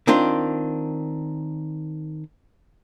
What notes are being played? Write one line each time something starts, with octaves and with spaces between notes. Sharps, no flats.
D#3 C4 D4 F4